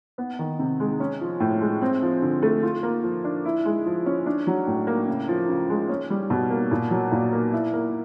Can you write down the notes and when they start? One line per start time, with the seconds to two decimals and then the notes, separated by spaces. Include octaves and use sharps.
0.18 B3
0.39 D#3
0.59 C3
0.80 G#3
1.00 C#4
1.21 F3
1.40 A2
1.61 G#3
1.82 C4
2.02 F3
2.22 D3
2.42 A3
2.63 F4
2.83 A#3
3.04 F3
3.24 D4
3.45 E4
3.65 G#3
3.86 F3
4.06 C#4
4.26 D4
4.47 F#3
4.67 A2
4.87 A#3
5.08 C#3
5.28 F3
5.49 C#3
5.69 G#3
5.89 C#4
6.10 G3
6.30 B2
6.50 A#3
6.71 A#2
6.91 F#3
7.12 A#2
7.32 A#3
7.52 E4
7.73 A#3